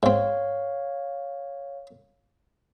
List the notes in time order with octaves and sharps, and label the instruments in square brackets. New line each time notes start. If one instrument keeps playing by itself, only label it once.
[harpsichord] G#2 C4 [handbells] C#5 F5